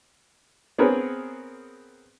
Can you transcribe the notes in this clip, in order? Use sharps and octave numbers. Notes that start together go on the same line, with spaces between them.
B3 C4 G#4 A#4 B4 C#5